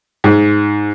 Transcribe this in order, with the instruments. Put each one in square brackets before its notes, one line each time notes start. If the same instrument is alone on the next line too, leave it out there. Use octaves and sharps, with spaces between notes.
[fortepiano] G#2